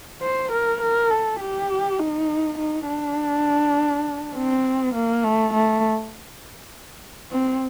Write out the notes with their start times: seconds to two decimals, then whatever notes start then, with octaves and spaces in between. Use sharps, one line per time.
0.22 C5
0.52 A#4
0.81 A#4
1.11 A4
1.40 G4
1.99 D#4
2.58 D#4
2.88 D4
4.36 C4
4.95 A#3
5.24 A3
5.54 A3
7.31 C4